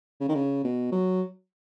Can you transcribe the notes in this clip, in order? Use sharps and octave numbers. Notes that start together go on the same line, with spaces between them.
C#3
D#3
C#3
B2
F#3